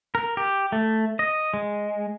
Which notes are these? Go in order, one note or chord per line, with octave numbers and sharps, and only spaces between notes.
A#4
G4
A3
D#5
G#3